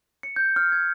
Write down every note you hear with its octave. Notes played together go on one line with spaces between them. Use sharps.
C#7
G6
F6
G#6